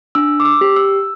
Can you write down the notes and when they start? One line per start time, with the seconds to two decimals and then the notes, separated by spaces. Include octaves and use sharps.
0.15 D4 E6
0.40 D6
0.45 E6
0.61 G4
0.76 E6